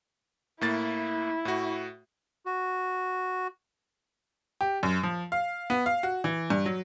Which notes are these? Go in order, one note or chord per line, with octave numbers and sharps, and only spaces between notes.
A2 A#3 E4 A6
A2 F#4
F#4
G4
F#2
F3
F5
B3
F5
F#4
E3
G2
F#3